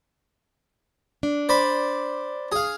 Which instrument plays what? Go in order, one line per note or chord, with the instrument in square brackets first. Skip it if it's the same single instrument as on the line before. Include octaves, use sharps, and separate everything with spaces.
[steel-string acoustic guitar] D4
[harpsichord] C5 D5 B5
G#4 F5